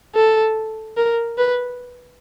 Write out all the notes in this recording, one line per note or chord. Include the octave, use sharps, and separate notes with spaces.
A4
A#4
B4